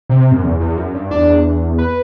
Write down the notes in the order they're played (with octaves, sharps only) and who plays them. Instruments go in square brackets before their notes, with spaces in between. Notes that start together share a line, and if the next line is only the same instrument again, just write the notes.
[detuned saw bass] C3
F#2
E2
E2
F#2
G2
[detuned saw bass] E2 [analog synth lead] D4
[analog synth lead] B4